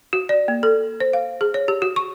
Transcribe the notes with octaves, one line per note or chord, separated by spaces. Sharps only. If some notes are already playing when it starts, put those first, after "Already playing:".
F#4
D5
A#3
A4
C5
F5
G#4
C#5
G4
F#4
C#6